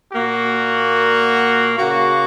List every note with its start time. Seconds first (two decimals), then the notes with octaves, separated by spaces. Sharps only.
0.11 A#2 A#3 F#4
1.78 C#3 A#3 F#4